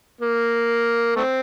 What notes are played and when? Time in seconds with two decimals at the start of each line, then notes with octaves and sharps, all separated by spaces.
0.21 A#3
1.16 A3 C4